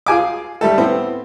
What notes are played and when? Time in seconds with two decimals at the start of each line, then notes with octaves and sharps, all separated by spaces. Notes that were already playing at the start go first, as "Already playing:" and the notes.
0.06 F4 G#4 G#5 D6
0.61 G3 A3 A4
0.78 A2 B3 C4